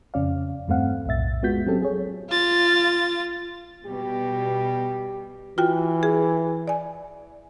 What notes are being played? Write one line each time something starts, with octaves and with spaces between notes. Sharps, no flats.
F2 C#3 C#4 D5 F5
E2 G2 A3 C4 F5 F#5
B1 F2 A2 E5 A6
G#3 B3 F4 F#4 G6 B6
F#3 C4 C#4 G4 A4
G#4 C#5
F4 A6
B2 G3 G4
E3 F4 F#4 G5
G#4
D5 G#5